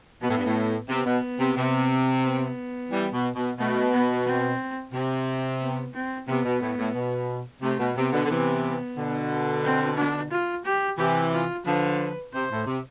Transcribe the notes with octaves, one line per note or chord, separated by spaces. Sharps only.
B2 B3
A2
G2
A2
C3 B3
B2
C3
C3
B3
E3 G3
B2
B2
B2 A3
B3
C4
C3 C4
B3
C4
C3 B3
B2
A2
A2
B2
C3 A3
B2
C3 B3
B2 D3
D3
C3 E3
B2 D3
C4
D4
F4
G4
C3 E3 G4
F4
D3 F3 B4
C3 C5
A2
C3